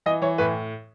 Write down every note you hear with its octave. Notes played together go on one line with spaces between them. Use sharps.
E3 D#5
E3 C#5
A2 B4